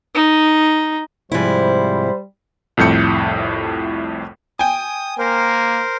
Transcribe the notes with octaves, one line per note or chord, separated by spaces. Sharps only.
D#4
G#2 C3 F3 G3 E4 C5
C2 F2 A2 G6 C#7
G5 G#5 D#6
A#3 A#4 C5